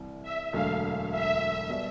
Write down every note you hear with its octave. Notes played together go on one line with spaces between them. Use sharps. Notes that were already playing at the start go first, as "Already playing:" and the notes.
Already playing: C2 C3 E3 G3
E5
E1 D2 D3 F#3 A3 F5
E5
B2 G3